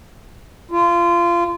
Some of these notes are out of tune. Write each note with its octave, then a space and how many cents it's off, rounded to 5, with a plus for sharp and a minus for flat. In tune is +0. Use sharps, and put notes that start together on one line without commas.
F4 -25